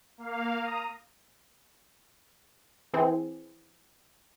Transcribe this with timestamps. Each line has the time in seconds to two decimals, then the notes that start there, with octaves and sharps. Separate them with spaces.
0.18 A#3 F5
0.60 A#5 D#6
2.93 E3 C4 G#4